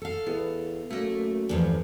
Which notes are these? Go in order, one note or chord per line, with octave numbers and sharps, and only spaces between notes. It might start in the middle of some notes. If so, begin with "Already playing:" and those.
A4 F5
E2 B3
F#2 A3 A#3
E2 G2 F3